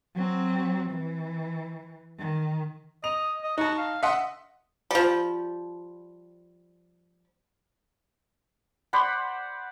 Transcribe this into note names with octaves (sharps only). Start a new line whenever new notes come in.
F#3 C4
E3
D#3
D#5 F7
D#5
D#4 F#4 A5
F5
D#5 E5 F#5 C6
F3 G3
C5 D5 F#5 B5